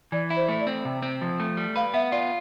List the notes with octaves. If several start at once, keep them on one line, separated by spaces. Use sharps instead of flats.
E3 D5
E4
C5
A3
D5
C4
C3
C4
F3
A3
G3
B4 F5
B3 E5
F4 D5